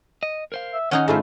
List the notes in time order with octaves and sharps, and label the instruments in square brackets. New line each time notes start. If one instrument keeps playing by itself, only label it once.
[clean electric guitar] D#5
A#4 C5 F5
[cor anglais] E5
[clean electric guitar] D#3 [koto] C#4 D#4 G#4 [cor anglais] F#5
[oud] G#2 A3 F4 [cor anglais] E4